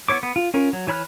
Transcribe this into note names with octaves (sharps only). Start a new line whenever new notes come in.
B3 E4 C#5 D6
B3
F4
C#4 F4 A#4
F#3
E3 C#5 B5 F6 F#6